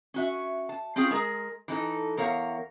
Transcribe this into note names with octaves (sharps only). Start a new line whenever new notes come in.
C#4 F#4 E5
A5
C4 C#4 F4 G4 G#4
G#3 G#4 A#4
E3 D#4 A4
E2 A#4 C#5 F5